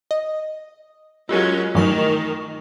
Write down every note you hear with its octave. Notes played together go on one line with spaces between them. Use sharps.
D#5
F#3 G#3 C#4 F4 G4 A#4
G2 D#3 E3 F#3 A3 C#6 A#6